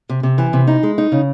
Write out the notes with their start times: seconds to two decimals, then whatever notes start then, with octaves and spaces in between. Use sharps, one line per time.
0.09 C3
0.23 C3
0.38 E3
0.53 C3
0.67 D#4
0.83 G#3
0.98 D#4
1.12 C#3